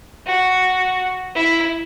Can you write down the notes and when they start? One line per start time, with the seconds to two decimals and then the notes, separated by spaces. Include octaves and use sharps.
0.26 F#4
1.35 E4